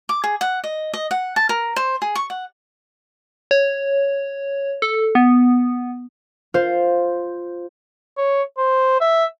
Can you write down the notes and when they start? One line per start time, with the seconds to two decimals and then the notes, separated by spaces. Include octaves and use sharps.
0.09 D6
0.24 G#4
0.41 F#5
0.64 D#5
0.94 D#5
1.11 F#5
1.36 A5
1.49 A#4
1.76 C5
2.02 G#4
2.15 C#6
2.30 F#5
3.51 C#5
4.82 A4
5.15 B3
6.54 F4 C5
8.17 C#5
8.58 C5
9.01 E5